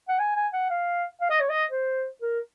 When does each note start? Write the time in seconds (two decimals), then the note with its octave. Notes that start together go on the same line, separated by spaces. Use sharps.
0.08 F#5
0.19 G#5
0.36 G#5
0.53 F#5
0.70 F5
1.21 F5
1.30 D#5
1.41 C#5
1.50 D#5
1.71 C5
2.22 A#4